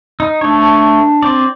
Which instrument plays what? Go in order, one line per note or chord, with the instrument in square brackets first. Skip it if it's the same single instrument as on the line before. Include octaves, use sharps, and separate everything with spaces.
[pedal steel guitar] D#4
[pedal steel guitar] A3 C#5 [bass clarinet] D4
[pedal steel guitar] C4 D5